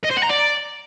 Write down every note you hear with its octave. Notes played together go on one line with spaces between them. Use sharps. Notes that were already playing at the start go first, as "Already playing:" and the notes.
D#5
C5
F#5
A#5
D5